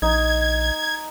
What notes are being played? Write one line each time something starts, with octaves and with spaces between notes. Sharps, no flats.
A#1 D#4 G#6